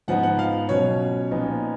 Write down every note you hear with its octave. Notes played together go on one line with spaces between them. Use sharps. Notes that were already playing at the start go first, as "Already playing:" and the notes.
G#2 F3 B3 D#4 F#5
F#5
F5
B2 F#3 C#4 C#5
A#2 F3 B3 D#4